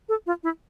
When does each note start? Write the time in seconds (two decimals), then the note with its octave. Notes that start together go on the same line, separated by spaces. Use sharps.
0.09 A4
0.26 F4
0.43 E4